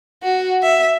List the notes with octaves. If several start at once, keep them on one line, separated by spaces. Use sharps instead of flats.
F#4
E5